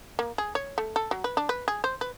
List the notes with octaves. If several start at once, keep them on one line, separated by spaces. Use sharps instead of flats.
A#3
G#4
C#5
A3
A4
F#3
B4
D4
B4
G#4
C5
B4